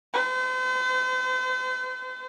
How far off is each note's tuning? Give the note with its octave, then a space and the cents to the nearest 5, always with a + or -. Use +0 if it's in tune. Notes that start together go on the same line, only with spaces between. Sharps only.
C5 -45